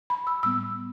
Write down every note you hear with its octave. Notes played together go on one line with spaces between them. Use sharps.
B5
E6
A2 G3 B3 E6